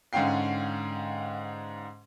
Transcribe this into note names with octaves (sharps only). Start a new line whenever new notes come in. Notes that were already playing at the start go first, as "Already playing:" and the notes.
G#2 D3 C#4 F5 G5 C7